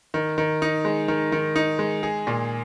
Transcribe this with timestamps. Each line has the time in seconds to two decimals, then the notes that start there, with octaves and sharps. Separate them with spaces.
0.14 D#3
0.38 D#3
0.62 D#4
0.85 G#3
1.08 D#3
1.32 D#3
1.56 D#4
1.79 G#3
2.03 G#4
2.27 A#2